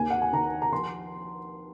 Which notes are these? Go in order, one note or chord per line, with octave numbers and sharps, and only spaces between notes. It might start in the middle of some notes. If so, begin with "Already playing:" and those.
Already playing: D#2 G#5
F#5
G#5
D#3 A#5
A#5
F3 C6